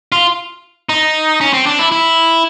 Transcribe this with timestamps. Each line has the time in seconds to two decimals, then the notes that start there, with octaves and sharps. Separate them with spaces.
0.12 F4
0.89 D#4
1.41 C#4
1.53 C4
1.66 D4
1.79 E4
1.92 E4